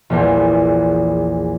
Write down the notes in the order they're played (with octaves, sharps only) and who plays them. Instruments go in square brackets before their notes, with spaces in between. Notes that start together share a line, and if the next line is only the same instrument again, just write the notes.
[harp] A#1 E2